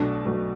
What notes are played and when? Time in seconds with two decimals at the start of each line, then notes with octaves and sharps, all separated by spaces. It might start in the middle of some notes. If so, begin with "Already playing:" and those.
Already playing: B1 B2 A3 D4
0.25 B1 B2 A3